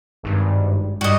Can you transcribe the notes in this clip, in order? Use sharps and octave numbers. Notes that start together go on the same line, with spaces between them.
G#1 G2
G2 G3 F#4 D#5